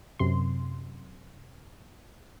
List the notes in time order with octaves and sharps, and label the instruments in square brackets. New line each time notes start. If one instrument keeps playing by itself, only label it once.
[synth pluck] F#2 C3 C6